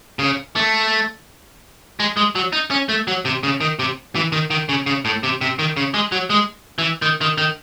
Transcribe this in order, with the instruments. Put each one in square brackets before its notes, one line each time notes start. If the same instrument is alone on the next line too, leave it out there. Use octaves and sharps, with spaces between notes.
[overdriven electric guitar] C#3
A3
G#3
G#3
F#3
D#4
C#4
A3
F#3
C3
C#3
D#3
C3
E3
D#3
D#3
C#3
C#3
A2
C3
C3
D#3
C#3
G#3
F#3
G#3
E3
D#3
D#3
D#3